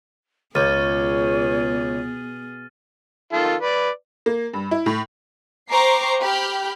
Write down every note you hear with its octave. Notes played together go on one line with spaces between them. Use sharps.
C#2 B2 B3 G#4 C#5 F6 A6 D#7
D#3 F4 A4
B4 D5
A#3
G2
E4
A2
C5 G5 A#5 C#6 D6 C7
G4 B5 F6 G6